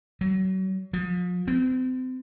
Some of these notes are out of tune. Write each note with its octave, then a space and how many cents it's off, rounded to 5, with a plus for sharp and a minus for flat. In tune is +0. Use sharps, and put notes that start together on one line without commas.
F#3 +30
F3 +40
C4 -35